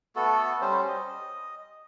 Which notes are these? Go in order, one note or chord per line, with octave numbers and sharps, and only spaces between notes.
A3 B3 F#4 A4
G3 C#4 C5
D#5